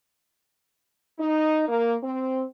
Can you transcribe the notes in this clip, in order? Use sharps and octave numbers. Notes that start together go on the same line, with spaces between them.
D#4
A#3
C4